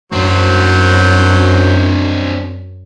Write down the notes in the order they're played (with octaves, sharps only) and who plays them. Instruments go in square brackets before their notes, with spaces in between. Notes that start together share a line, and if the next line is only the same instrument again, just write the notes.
[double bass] F#2 [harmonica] F#3 C5 [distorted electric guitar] C4 D4